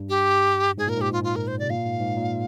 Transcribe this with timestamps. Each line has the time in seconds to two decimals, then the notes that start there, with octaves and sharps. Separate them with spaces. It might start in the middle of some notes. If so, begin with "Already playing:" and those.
Already playing: G2
0.09 G4
0.78 G#2 G#4
0.87 A#2 A#4
0.97 G#2 G4
1.13 F4
1.24 F4
1.36 A#4
1.47 C5
1.59 C3 D5
1.70 A#2 F5
1.85 G#2
2.00 G#2
2.17 A#2